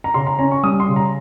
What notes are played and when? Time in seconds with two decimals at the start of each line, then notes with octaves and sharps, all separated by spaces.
0.04 A#5
0.14 C#3 C6
0.27 A#5
0.39 C#4 A#5
0.51 C#6
0.63 G3 D#6
0.80 C6
0.88 C#3
0.96 A#5